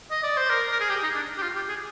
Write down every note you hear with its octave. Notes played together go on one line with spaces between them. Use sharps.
D#5
D5
C5
A#4
A#4
G#4
G4
D#4
D4
G4
F4
G4
G#4